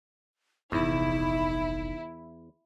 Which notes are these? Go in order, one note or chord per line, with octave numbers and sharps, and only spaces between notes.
F1 A#1 E2 D#4 E4